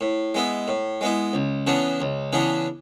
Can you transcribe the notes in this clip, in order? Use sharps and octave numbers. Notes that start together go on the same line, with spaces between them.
A2
G#3 B3 E4
A2
G#3 B3 E4
C#2
C#3 E3 B3 D4
C#2
C#3 E3 B3 D4